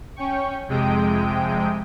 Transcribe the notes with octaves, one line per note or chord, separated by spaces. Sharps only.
C#4 G5 C#6
F2 C3 G#3 G5 D#6 D7